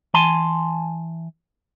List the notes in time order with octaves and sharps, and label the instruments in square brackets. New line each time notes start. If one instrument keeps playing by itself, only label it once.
[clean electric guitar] E3 G#5 A5 C6